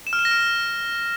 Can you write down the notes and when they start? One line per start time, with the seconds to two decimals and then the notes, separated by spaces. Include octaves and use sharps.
0.07 E7
0.13 F6
0.19 E7
0.25 A#6
0.31 F6